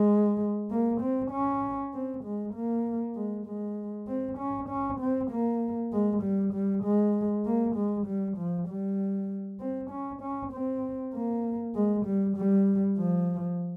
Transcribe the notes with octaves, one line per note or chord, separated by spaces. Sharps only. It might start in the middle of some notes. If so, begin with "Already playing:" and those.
Already playing: G#3
A#3
C4
C#4
C4
G#3
A#3
G#3
G#3
C4
C#4
C#4
C4
A#3
G#3
G3
G3
G#3
A#3
G#3
G3
F3
G3
C4
C#4
C#4
C4
A#3
G#3
G3
G3
F3